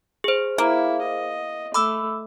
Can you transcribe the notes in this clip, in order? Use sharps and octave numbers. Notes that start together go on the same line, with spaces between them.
G#4 C5
A#3 E4
D#5
A3 B5 D6 E6